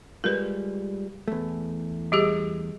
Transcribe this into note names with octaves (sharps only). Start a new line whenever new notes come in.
G3 G#3 F4 A#4 B4
E2 A3
G3 G4 G#4